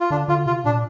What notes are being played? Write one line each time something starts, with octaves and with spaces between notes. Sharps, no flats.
F4
D3 D4
D3 F4
C3 F4
A#2 D4